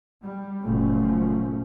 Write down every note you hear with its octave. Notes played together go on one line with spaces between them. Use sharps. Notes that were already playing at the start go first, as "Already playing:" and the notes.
G3
F#1 A#2 F3 A3 C#4